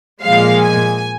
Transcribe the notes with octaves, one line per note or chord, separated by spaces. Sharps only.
A#2 F3 G#3 F5
G#5